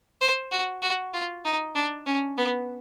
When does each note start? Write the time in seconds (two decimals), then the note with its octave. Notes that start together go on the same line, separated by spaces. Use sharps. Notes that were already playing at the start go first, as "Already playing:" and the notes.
0.21 C5
0.51 F#4
0.82 F#4
1.13 F4
1.45 D#4
1.75 D4
2.06 C#4
2.37 B3